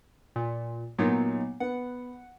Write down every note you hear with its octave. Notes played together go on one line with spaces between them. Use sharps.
A#2
A#2 F#3 B3 D#4
B3 F#5